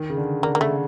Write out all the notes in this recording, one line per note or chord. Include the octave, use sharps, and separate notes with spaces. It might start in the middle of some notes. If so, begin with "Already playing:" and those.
Already playing: D#3
C#3
D3
D3 A#3
A#3
C#3 A3